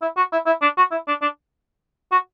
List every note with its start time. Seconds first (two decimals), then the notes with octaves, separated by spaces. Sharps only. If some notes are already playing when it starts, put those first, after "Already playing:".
0.02 E4
0.17 F#4
0.32 E4
0.46 E4
0.62 D4
0.77 F#4
0.91 E4
1.08 D4
1.21 D4
2.12 F#4